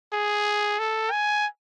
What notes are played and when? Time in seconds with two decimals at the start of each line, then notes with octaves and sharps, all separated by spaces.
0.13 G#4
0.79 A4
1.12 G#5